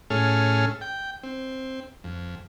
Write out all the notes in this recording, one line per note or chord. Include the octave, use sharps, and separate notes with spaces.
A2 C#4 G#4 A4 F6
G5
C4
F2